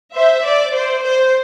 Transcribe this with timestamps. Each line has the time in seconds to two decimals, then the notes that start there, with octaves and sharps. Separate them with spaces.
0.14 C5 E5
0.44 D5
0.73 C5
1.03 C5